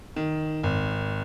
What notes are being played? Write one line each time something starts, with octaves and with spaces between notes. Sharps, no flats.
D#3
G#1